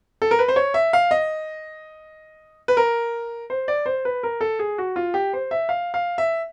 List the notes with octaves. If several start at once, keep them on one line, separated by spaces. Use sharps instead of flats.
A4
A#4
B4
C5
C#5
E5
F5
D#5
B4
A#4
C5
D5
C5
B4
A#4
A4
G#4
F#4
F4
G4
C5
E5
F5
F5
E5